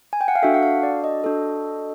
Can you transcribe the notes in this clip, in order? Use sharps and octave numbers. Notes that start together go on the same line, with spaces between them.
G#5
G5
F#5
F5
D4 F#4 A4 E5
F#5
F5
D5
D#5
D4 F#4 A4